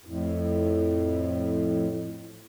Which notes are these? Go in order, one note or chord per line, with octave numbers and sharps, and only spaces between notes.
F2 A2